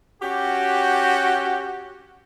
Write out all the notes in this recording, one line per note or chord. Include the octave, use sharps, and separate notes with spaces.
C#4 F#4 G4